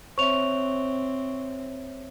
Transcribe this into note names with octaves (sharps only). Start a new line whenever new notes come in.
C4 C5 C#5 E5 C#6 F7